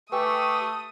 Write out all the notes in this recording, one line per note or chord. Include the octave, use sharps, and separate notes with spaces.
A3 G4 B4 G5 G#5 C#6 D#6 E6